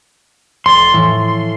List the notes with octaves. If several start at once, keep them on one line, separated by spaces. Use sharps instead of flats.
F1 C6 G#6 A6
A2 E3 F3